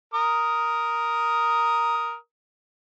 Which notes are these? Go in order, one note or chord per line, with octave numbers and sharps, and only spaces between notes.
A#4 D#6